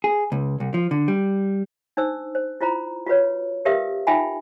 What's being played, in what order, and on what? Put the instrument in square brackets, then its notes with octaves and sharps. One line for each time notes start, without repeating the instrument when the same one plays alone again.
[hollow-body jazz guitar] G#4
C#2
C2
F3
D3
G3
[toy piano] D4 D#4 C5 E6
C5
E4 F4 C5 A#5 B5
F4 F#4 B4 C#5
G4 A#4 B4 E5 F5 D#6
D#4 F4 E5 G5 G#5 B5